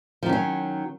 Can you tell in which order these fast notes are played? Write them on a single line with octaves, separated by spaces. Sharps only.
F3 D#3 C#4 F#3